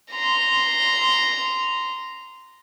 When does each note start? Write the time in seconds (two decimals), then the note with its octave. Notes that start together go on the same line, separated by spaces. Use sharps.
0.11 A#5 C6